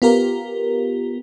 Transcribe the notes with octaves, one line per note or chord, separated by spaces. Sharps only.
B3 F4 G4 A#4